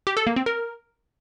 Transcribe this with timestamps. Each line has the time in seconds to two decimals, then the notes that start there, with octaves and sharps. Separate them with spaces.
0.07 G4
0.17 A4
0.27 A#3
0.36 C4
0.46 A#4